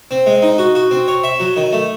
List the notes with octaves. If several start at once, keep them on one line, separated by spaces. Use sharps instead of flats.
C4
G#3
D#4
F#4
F#4
C4
C#5
E5
F#3
D#3
A3